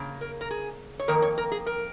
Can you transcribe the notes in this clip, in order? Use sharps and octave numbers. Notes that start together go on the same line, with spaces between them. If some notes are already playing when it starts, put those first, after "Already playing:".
Already playing: C#3 A#3
A#4
A#4
G#4
C#5
F2 D#3 A#3 A#4
C#5
A#4
G#4
A#4